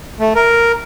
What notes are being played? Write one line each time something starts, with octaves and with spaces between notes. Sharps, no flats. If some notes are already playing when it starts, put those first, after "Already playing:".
A3
A#4